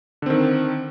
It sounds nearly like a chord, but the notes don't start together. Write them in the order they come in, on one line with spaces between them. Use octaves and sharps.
D3 C4 D#3